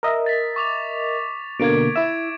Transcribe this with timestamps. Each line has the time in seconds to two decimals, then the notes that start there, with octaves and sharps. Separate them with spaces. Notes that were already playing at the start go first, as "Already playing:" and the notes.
0.03 A#4 D#5 E5
0.26 A6 B6
0.56 C#6 D6 F7
1.60 B2 D3 A#3 G#6 D7
1.96 E4 E5 E7